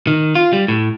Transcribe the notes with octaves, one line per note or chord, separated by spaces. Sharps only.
D#3
F4
G3
A2